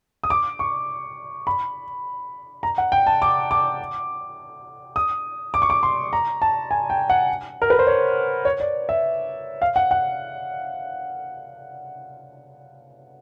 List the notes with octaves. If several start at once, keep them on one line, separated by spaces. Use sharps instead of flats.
D#6
D6
C#6
B5
A#5
F#5
G5
A5
D6
D6
D#6
D6
C#6
D6
C6
A#5
A5
G#5
G5
F#5
A#4
B4
C5
C#5
C#5
D5
E5
F5
F#5
F#5